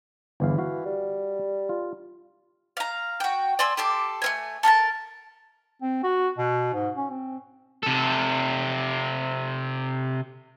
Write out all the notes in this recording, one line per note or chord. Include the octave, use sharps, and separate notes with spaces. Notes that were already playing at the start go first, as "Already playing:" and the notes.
G1 E2 E3 F5
F#4 F5
G3
F4
F5 A#5
F#4 G5
D5 G#5 C6 E6
G4 A4 C6 D6
A3 C4 G#5
A4 A#4 F5 A5
C4
F#4
B2
G#2
C#4
C4
C3 A4